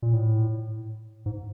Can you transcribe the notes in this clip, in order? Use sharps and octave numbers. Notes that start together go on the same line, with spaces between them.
A#2
A2
G#2